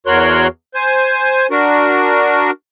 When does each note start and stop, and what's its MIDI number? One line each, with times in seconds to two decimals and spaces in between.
0.06 0.47 40
0.06 0.47 66
0.06 0.47 70
0.06 0.47 73
0.06 0.47 84
0.06 0.47 90
0.74 1.47 72
0.74 1.47 80
1.51 2.51 62
1.51 2.51 66
1.51 2.51 70